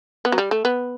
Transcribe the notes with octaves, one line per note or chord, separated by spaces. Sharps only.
B3
F#3
G3
A3
B3